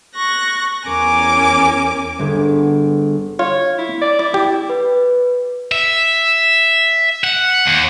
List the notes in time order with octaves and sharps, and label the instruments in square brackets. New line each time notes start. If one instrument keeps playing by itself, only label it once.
[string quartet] C#6 F#6 A#6
E2 C#4 A#4 G#5 D6
[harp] G1 B3 G#4
[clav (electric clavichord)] F4 [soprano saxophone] C#5
[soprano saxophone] E4
D5
[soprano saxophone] E4 [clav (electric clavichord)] D5
[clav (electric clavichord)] G4
[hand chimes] B4
[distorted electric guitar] E5
F#5
D#2